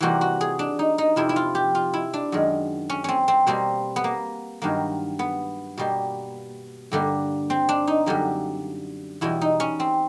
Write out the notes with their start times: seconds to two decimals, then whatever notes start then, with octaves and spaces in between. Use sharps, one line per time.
0.01 C3 E3 G3 A#3 F#4
0.21 F#4
0.41 G#4
0.59 D4
0.79 D#4
0.98 D#4
1.16 F2 C3 F3 E4
1.29 E4
1.36 F4
1.55 G4
1.75 F4
1.94 E4
2.13 D4
2.32 F#2 D#3 G#3
2.90 C#4
3.04 C4 C#4
3.28 C4
3.47 B2 G3 A#3 C4
3.96 B3
4.04 A#3
4.62 G2 D#3 F#3 A#3
5.19 B3
5.78 B2 G3 A#3
6.92 G2 D3 G3 A#3
7.50 C4
7.69 D4
7.87 D#4
8.06 F#2 D3 G3 A#3
9.21 E2 B2 G3 E4
9.41 D#4
9.60 C#4
9.80 C4